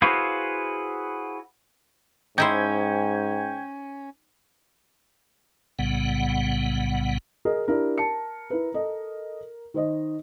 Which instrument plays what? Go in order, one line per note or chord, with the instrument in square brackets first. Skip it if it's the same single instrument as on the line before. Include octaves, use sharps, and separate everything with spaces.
[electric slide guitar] E4 F#4 G#4 B4 C5 F5
[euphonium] G#2 [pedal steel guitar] C#4 [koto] D#4 E4 C5 [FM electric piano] G5 G6 G#6
[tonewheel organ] B1 A2 C#3 G3 B3 F#5
[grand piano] G#4 A#4 [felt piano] D#5
[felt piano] D4 E4 G4 [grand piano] A#4
[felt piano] A5 C#7
E4 B4
A4 D#5
D#3 C5 D#5